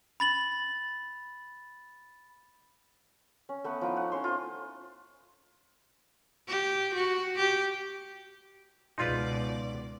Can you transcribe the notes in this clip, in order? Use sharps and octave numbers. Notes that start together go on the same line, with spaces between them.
B5 A6 F#7
C#4
A3 B3 F#5
F3 D#4 E4
F#5
C#4 C#5 C6
F4 C5
G4
F#4
G4
C#2 B2 D#4 F4 B4 D5 C6